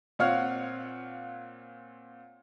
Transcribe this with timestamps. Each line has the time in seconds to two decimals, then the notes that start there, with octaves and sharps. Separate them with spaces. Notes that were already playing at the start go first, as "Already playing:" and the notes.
0.19 A#2 C4 C#5 F5 F#5 F6